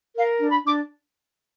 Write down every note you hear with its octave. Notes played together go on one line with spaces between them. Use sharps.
A#4 F5
D4
B5
D4
D6